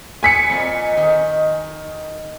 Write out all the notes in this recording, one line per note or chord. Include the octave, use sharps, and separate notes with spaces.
G#5 B6 C#7
F2 A#2
D#3